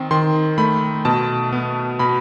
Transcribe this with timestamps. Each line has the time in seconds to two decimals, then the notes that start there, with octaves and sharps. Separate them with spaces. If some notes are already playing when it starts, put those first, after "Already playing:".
Already playing: D#3 C4
0.11 D#3 C6
0.58 A3 B5
1.05 B2 A5
1.53 B3
1.99 B2 B5